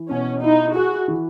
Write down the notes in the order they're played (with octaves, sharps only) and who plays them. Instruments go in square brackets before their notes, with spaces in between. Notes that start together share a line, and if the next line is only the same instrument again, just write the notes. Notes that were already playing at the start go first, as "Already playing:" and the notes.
Already playing: [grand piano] E3
[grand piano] B2 [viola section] C#4
[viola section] D#4 [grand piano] E4
[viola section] F#4 [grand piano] G#4
[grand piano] E3